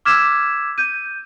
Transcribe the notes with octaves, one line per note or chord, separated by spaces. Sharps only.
D6 E6 F6 G#6 B6 E7
G6 D#7